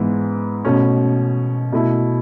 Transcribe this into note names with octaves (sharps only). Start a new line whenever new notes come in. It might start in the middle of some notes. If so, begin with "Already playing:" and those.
Already playing: G#2 E3 B3 E4
B2 A3 C#4
B2 A3 E4